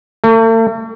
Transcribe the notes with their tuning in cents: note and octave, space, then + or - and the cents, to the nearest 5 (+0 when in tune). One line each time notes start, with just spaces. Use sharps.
A3 +45